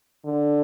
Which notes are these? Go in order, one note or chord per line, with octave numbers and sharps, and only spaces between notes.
D3